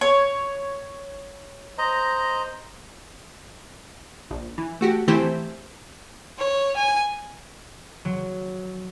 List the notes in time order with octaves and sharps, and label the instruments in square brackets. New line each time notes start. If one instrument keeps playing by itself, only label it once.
[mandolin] C#5
[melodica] C5 D#5 A#5
[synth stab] A#1
E3
A3 F#4 G4
E3 A3 C4 E4 G4 C5
[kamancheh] C#5
G#5
[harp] F#3